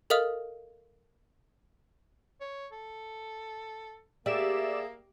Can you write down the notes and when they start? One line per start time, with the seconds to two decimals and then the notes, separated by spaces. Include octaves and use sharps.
0.10 A4 A#4 D#5 F5 D#6 F6
2.41 C#5
2.72 A4
4.26 A#3 G4 G#4 D5 E5 E7